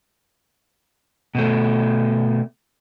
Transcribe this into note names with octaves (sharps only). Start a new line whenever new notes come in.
B2 A3